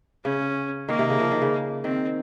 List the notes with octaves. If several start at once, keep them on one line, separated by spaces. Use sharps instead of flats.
C#3 C#4
D#3 A#3
C3
C#3
F3
D#3
C#3
D#3 C4